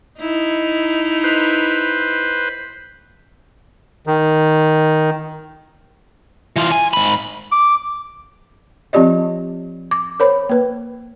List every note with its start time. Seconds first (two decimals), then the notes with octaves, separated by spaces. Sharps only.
0.19 D#4 E4
1.24 B4 C5
4.07 D#3
6.56 E3 F4
6.72 G#5
6.93 G#2 B5
7.52 D6
8.93 F3 C4 F4 G4 D5 D#5
9.91 D6
10.20 A#4 C5 C#5 B5
10.49 A#3 B4